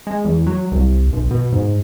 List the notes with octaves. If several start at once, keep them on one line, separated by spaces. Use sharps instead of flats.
G#3
E2
F#3
C2
B1
B2
G#2